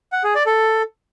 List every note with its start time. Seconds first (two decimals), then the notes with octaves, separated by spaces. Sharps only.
0.12 F#5
0.24 G#4
0.35 D5
0.46 A4